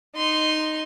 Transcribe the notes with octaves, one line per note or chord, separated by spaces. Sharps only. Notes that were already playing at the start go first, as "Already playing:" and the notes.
D#4 C6